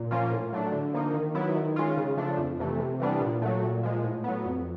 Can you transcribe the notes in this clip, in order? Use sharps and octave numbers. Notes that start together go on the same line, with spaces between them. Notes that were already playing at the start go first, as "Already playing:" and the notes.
Already playing: A#2
F3 A#3 C#4 F4
A2
F#3 A3 D4
D3
F3 A#3 D#4
D#3
F#3 B3 E4
D#3
G#3 C#4 F4
C#3
F3 A3 D4
F2
C3 E3 A3
C3
E3 G3 B3 D4
A#2
F#3 A3
A#2
F3 G#3
A2
F#3 B3
F2